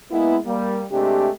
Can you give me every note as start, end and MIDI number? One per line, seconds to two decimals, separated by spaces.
0.11 0.37 56
0.11 0.37 58
0.11 0.37 59
0.11 0.37 64
0.46 0.81 55
0.46 0.81 58
0.92 1.29 48
0.92 1.29 56
0.92 1.29 57
0.92 1.29 62
0.92 1.29 67